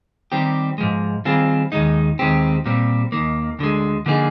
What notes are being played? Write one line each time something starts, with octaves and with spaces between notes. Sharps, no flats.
D#3 G3 C4 G4
G#2 F3 G#3
D#3 G3 C4 F4 G#4
D#2 D#3 G#3 D#4
D#2 D#3 G#3 C4 G4
A#2 G3 C4
D#2 D#3 A#3
D2 D3 G#3
D3 F3 A#3 D#4 G#4